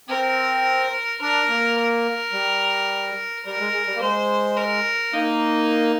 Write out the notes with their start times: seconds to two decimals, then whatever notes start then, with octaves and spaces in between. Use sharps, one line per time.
0.09 C4 A#4
1.21 D4 A#4
1.49 A#3
1.77 A#4
2.33 G3
3.45 G3 A#4
3.59 G#3
3.73 G#3
3.87 G3
3.95 A#3
4.01 G#3 C5
4.57 A#4
5.13 A#3 D#4